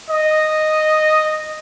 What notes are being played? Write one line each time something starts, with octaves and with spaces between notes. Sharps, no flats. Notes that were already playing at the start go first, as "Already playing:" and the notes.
D#5